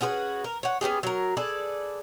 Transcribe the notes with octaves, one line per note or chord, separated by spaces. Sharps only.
C#4 F#4 G#4 B4
A#4
C#5 F#5
B3 C#4 G4 G#4
F#3 A#4
G#4 A4 B4 D5